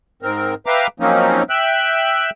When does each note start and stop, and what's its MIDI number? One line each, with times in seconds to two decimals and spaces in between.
0.22 0.54 44
0.22 0.54 60
0.22 0.54 70
0.66 0.87 71
0.66 0.87 76
0.66 0.87 77
0.66 0.87 79
0.66 0.87 82
0.66 0.87 86
1.00 1.43 53
1.00 1.43 54
1.00 1.43 58
1.00 1.43 60
1.00 1.43 61
1.00 1.43 63
1.50 2.30 76
1.50 2.30 79
1.50 2.30 88
1.50 2.30 90